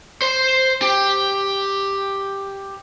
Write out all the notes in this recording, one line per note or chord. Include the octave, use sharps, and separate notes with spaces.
C5 C6
G4